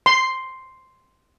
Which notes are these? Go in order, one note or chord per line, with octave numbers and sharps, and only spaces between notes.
C6